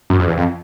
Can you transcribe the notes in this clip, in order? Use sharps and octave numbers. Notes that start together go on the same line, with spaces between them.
F#2
F2
E2
F2